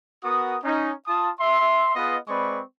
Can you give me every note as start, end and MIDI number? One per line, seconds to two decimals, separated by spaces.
0.24 0.57 59
0.24 0.57 66
0.24 0.57 70
0.24 0.57 87
0.64 0.91 61
0.64 0.91 63
1.07 1.30 65
1.07 1.30 81
1.07 1.30 87
1.40 1.94 76
1.40 1.94 84
1.96 2.17 59
1.96 2.17 65
1.96 2.17 68
1.96 2.17 71
1.96 2.17 75
2.28 2.60 56
2.28 2.60 60
2.28 2.60 71
2.28 2.60 74
2.28 2.60 83
2.28 2.60 85